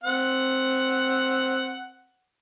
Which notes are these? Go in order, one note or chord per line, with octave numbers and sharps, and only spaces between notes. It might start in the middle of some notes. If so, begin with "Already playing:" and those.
C4 F#5